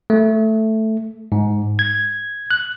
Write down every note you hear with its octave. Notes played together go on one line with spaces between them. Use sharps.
A3
G#2
G#6
F#6